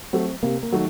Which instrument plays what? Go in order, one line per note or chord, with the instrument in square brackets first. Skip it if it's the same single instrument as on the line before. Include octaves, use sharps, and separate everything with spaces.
[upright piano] F#3 A3 [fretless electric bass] C4
[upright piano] C3 [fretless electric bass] A#3
[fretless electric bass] A#3
[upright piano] D#3 F#3 A3